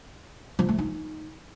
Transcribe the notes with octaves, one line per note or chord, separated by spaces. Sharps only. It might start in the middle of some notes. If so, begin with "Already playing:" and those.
F3
A3
D#4